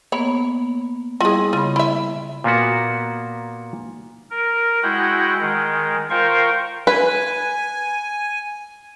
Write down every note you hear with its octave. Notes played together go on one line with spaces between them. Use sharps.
A#3 B3 C#5 B5
G3 E4 F4 G#4 D#5
C#3 F4 B5
E4 E5
A#2 A#3 B3 F#4
A#4
G#3 E4 F#4 F#5 G5
D#3 G#3
F4 A#4 C5 F5 G5 C#6
B4 G#5